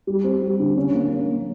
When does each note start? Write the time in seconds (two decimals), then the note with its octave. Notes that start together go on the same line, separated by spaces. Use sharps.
0.07 G3
0.24 C4
0.42 G3
0.59 D3
0.76 C#4
0.94 A#3
1.10 C#4
1.27 A#3